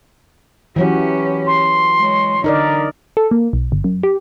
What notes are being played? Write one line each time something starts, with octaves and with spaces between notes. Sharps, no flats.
E3 F#3 C#4 F#4 G4
C6
G#3 C#5
D3 D#4 A#4 D5
A4
A#3
B1
G1
F#2
G4